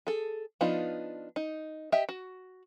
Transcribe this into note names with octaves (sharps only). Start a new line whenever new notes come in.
G#4 A4
F3 B3 D4 D#4 F4
D#4
G4 D#5 E5 G5
F#4